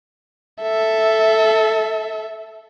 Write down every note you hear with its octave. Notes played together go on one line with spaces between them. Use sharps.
A4 E5